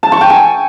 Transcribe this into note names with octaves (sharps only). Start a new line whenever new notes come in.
A5
C#6
G5
G#5